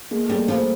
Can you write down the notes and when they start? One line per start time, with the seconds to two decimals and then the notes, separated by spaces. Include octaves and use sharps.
0.11 G#3 A#3
0.26 A3
0.30 G3 G#3 A#3
0.48 F3 G3 A3